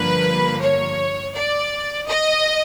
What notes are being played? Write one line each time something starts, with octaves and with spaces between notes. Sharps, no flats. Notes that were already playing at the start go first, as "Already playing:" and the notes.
Already playing: G2 D3 F3 A#3 B4
C#5
D5
D#5